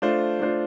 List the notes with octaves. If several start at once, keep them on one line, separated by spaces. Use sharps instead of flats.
A3 D4 F4 C5
A3 D4 F4 C5